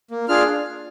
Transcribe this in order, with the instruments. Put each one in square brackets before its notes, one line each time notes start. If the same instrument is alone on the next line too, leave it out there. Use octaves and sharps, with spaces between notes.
[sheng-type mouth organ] A#3
D4 F4 G#4 F6